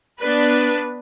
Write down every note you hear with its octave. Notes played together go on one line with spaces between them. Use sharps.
B3 D4 B4